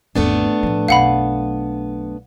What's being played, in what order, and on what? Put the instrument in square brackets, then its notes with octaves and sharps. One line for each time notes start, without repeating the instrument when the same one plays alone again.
[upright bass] G#1 E2 [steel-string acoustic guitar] A3 B3 D4
[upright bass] A2 F3
[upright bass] B1 F#2 [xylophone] F5 F#5 B5